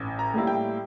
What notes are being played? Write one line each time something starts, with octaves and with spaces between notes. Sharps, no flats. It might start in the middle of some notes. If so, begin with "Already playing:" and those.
Already playing: A1
A#5
A2 G3 A#3 E4
G5